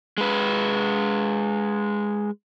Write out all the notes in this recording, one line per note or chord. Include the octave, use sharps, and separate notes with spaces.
G#3 B4